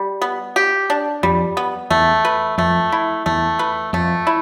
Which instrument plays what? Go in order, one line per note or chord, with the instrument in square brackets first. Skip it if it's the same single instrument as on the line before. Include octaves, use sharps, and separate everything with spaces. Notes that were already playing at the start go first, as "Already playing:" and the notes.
Already playing: [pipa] G3
B3
G4
D4
[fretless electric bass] F2 [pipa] G3
[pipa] B3
[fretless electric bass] E2 [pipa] A3
[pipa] B4
[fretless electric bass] F2 [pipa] A3
[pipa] E4
[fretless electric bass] E2 [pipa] A3
[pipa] B4
[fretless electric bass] F2 [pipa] A3
[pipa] E4